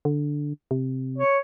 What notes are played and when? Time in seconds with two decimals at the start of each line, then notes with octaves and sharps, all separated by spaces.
0.05 D3
0.71 C3
1.18 C#5